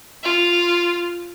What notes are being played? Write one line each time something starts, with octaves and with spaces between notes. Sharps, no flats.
F4